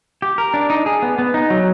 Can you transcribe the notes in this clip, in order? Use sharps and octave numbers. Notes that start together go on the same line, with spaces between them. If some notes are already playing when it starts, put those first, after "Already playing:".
G4
A#4
D4
D#4
G#4
B3
B3
D#4
F#3